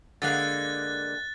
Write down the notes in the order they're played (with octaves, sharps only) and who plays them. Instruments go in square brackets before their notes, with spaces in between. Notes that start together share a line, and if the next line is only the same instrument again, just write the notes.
[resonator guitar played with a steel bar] D3 G#3 A#3 [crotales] F#6 A6